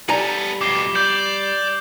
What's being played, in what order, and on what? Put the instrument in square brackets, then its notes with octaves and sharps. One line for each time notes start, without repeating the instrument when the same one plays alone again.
[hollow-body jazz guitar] G3 G#5 A#5 [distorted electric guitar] B3 A4
[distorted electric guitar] F2 B2 [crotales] D6 C7 G7
[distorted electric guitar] D5 [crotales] D6 G6